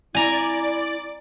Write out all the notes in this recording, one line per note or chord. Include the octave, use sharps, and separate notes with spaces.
E4 D5 G#5 A#5